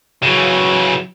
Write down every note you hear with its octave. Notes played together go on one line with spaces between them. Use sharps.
C#3 E3 F#3